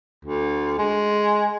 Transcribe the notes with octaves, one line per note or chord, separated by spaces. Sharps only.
D2
G#3